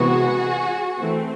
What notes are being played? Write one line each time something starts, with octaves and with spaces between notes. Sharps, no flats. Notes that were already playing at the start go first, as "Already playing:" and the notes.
Already playing: C3 E3 G#3 B3 F#4 G#4
E3 A3 C4